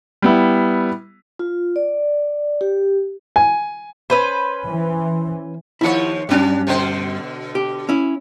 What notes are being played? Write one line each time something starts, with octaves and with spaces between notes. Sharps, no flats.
G3 B3 E4
F4
D5
G4
G#5
C#4 B4 C5
E3
D#2 F3 E4 C#5 F#5
G2 F#3 C#4 D4
B2 D3 C5
G4
C#4 E4